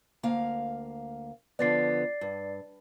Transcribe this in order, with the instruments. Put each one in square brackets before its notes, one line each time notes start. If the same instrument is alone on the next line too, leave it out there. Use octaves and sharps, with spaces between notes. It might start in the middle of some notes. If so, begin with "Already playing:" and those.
[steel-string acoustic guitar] D2 A#3 F5
[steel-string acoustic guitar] D3 F3 B3 [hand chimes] D5 A6 C7
[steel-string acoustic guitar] G2